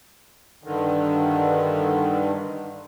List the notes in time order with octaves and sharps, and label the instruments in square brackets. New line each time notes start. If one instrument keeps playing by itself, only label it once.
[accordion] G2 D3 D#3